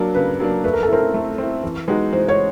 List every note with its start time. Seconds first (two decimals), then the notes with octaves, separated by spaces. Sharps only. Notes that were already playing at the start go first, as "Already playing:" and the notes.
Already playing: F#3 A#3 D4
0.14 C#3 B4
0.40 F#3 A#3 D4
0.64 A3 B4
0.73 A#4
0.83 A4
0.89 C4 E4 A#4
1.14 A3
1.38 C4 E4
1.63 E3
1.88 G#3 B3 D#4 F#4
2.12 E3 C5
2.28 C#5